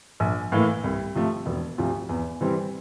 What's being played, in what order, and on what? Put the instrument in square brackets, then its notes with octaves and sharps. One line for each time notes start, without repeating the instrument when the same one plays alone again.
[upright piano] A#1
A2 E3 A#3
C2
C3 F3 A3
E1
D2 C3 F3
E2
C3 E3 G3 C4